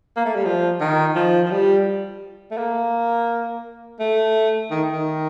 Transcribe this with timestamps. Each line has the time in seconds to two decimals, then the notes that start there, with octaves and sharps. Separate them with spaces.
0.17 A#3
0.25 A3
0.36 G3
0.45 F3
0.80 D#3
1.15 F3
1.46 F3
1.51 G3
2.51 A3
2.57 A#3
4.00 A3
4.71 D#3
4.91 D#3